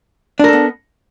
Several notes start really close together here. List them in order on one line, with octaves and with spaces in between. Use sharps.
D4 A#4 A4 B3